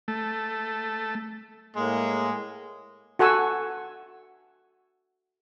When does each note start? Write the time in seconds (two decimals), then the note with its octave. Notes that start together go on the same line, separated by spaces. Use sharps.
0.08 A3
1.76 A2 G#3 A#3
3.19 F#4 A4 F#5 G#5 C#6 E6